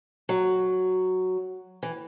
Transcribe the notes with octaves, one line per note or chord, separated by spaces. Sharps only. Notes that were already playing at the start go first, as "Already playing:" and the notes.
F#3
E3